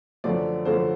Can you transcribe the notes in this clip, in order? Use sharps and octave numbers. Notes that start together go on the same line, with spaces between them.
F#2 D3 F3 A3 D5
F#2 D3 F3 A3 C5